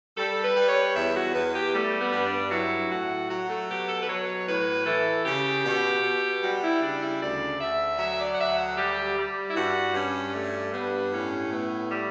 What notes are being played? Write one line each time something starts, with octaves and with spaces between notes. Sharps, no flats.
G3 A4
B4
G3
C#5
E2 E5
F#4
E2 B4
G4
G3 A3
B3
G2
D4
F#3 E4
A2 F#4
F#3 F#4
A3
B2 G4
A4
B4
F#3 C#5
A2 B4
E3 A4
C#3 G4
B2
B2
G3 F#4
E4
C#3 D4
E4
D2 D5
D2 E5
F#3 E5
D5
F#5
D2 E5
F#5
G3 G4
G3
E4
G2 F#4
G2 C#4
G3 A3
G2 B3
A2 C#4
A3 B3
G3